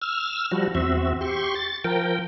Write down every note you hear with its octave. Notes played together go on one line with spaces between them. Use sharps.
E6 F6
F3 G3 F#4
E2 C4 F#4 E5
G4 C6 C#6
A6
F3 A#4 G5